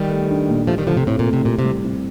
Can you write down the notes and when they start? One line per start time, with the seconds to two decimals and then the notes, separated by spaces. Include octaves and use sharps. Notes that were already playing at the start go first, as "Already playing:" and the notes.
Already playing: D#3 G3 G4
0.11 A3
0.30 D4
0.49 A#2
0.67 F3 A3 G4
0.78 D#3 G3
0.87 D3 F3 A3
0.97 C3
1.07 A2 C4
1.19 A#2
1.25 A2
1.33 C3
1.45 A#2 G4
1.59 C3
1.64 G3
1.85 C4